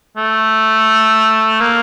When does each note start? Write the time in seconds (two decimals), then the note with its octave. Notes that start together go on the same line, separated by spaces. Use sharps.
0.17 A3
1.61 A#3